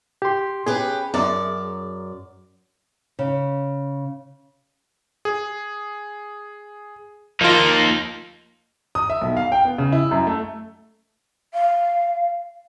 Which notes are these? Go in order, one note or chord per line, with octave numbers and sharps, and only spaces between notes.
G4 C6
C#4 G4 G#4 B4
F#2 D5
C#3
G#4
F3 A#3 D#4 F4
D#6
E5
B1
F5
G5
B3
C#3
E4
F#2
A3
F5